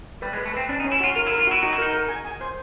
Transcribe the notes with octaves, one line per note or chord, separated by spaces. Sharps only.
G3 B4
G#3
B4
A3
C4 B4
C#4 D4
D#4
C#4
E4
F4 F#4
F4 A#4
E4
A#4
F4
E4 F#4
D#4 F#4
E4
D#4 A#4
A#4
G#5
G#5
C5